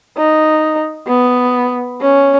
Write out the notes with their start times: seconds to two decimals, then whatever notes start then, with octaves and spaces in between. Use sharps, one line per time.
0.18 D#4
1.07 B3
2.01 C#4